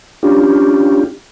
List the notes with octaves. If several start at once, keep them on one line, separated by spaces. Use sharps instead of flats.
C#4 D4 F4 G4